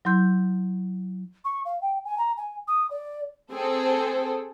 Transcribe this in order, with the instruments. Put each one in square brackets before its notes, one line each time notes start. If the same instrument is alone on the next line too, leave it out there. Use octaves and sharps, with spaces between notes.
[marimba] F#3 E4 C6 G6
[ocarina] C#6
F5
G5
G#5
A#5
G#5
D#6
D5
[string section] C4 G#4 A4